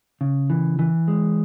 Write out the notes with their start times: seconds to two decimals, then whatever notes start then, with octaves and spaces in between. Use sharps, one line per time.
0.21 C#3
0.50 E3
0.79 E3
1.08 G#3